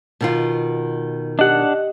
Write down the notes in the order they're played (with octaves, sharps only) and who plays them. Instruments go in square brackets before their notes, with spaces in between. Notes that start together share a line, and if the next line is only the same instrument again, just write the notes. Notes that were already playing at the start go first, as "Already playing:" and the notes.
[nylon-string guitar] B2 D#3 F4
[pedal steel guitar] D4 F#5 [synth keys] G4 D#5